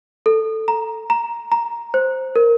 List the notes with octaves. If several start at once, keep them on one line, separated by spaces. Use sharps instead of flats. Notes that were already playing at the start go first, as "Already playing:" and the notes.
A4
A#5
A#5
A#5
C5
A#4